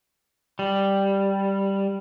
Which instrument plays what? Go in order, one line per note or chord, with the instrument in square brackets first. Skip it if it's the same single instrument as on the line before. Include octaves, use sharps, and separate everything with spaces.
[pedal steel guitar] G3